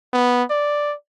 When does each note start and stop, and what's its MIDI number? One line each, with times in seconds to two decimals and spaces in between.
0.13 0.44 59
0.50 0.94 74